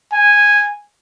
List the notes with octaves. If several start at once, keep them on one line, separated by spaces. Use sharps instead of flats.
G#5